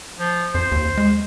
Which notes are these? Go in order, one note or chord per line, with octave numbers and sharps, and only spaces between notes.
F3
F2 C5
D#2
G#3